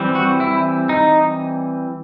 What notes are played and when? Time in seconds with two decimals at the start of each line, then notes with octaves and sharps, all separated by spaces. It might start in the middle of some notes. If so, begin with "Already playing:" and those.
Already playing: E3 G3 C4
0.15 F#4
0.40 E4
0.89 D#4